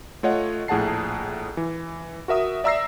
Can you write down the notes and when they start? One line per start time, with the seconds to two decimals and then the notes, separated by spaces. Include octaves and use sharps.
0.23 A3 F4 C#5 D#5 F#5
0.68 A#1 A2 G#4 F#5 A5 C7
1.57 E3
2.28 F#4 A#4 E5 D#6
2.64 D5 E5 A#5 E6 A#6 C7